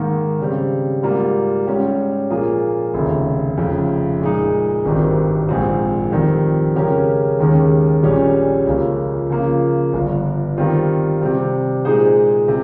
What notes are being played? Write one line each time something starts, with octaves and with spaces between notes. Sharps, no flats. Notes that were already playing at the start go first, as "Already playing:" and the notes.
Already playing: G#2 D#3 A#3
C#3 G3 C4
G#2 G3 A#3 F4
G#2 G3 C#4 G4
A#2 F3 A#3 F4 G#4
F1 D#2 C#3
F1 F2 C#3 F3
A#2 G#3 D#4
G#1 G2 D#3 G3 C4
A#1 G#2 F3 C4
F2 D#3 G3 C4
C#3 G#3 C#4 G4 A#4
D#2 D#3 G#3 C#4 G4
A#1 A#2 G3 C#4 G#4
C#2 C#3 F3 A#3
C#3 F3 A#3 F4
G1 G2 F3
D#3 G3 C4 F4
C3 G3 C4
A#2 G#3 D#4 G#4 C5
C3